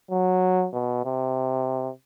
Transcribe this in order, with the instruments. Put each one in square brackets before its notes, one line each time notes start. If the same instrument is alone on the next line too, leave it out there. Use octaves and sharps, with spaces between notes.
[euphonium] F#3
B2
C3